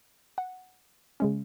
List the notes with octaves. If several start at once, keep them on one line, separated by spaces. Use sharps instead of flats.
F#5
C#3 G#3 C#4